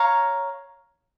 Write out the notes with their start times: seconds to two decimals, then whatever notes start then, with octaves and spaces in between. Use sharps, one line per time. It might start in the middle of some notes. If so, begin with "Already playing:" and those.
Already playing: C#5 F5 A#5